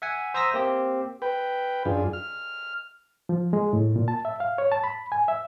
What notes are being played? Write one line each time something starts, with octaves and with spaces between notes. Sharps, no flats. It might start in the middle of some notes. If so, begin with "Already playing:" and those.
E5 F#5 G#5
C5 E5 A#5 D#6 E6 A#6
A#3 C4 G4
B4 G5
F#2 D4 F4 G#4
F6
F3
G#3
A2
A#2
A5
E5
F5
C#5
A5
B5
G#5
E5